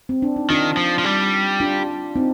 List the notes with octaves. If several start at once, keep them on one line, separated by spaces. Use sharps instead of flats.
C4
D4
D#4
D#3 D4 F4
F3
F3
G3
D4 F4
C4 D#4